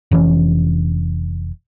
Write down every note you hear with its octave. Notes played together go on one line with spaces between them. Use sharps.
F1 E3 C#4